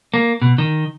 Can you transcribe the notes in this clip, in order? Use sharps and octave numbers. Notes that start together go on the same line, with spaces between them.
A#3
B2
D#3